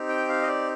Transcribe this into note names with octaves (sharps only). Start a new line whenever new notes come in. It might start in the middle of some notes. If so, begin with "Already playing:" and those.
Already playing: C4 D#4 G4
G5
F5
D#5
D5